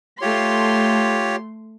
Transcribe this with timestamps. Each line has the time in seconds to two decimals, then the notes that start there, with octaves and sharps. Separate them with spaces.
0.21 A3 F4 G4 C#5 C6